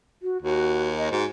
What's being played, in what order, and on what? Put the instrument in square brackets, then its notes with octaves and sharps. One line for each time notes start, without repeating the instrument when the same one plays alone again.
[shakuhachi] F#4
[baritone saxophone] D#2 [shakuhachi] F#4
[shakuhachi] D#5
[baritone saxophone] G#2 [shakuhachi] F#4